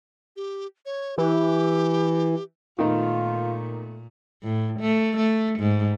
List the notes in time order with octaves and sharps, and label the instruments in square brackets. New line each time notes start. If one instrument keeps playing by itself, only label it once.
[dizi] G4
C#5
[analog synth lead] E3 [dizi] G4
[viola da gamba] A#2 [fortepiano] D#3 D#4 [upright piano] A3 B3 [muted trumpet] F4
[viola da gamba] A2
A3
A3
G#2